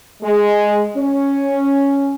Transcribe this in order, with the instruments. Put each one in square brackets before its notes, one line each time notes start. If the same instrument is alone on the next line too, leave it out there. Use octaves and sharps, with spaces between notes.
[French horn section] G#3
C#4